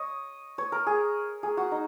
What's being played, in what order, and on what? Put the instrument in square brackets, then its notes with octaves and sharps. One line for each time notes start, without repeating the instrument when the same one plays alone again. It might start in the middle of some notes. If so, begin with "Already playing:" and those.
Already playing: [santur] C#5 D#5
C#5
A#4
G#4
G#4
F#4
D#4